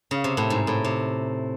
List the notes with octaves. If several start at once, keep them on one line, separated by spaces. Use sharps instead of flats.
C#3
C3
A2
G#2
A2
C3